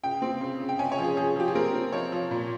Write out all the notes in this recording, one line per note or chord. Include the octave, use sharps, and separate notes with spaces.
C#3 G5
C4
C#3
C#3
G5
C#4 G#5
C#5
F3
G#4
F3 G#4
F3 G4
G#4
C4 A#4
C4
F3 C#5
F3
A#2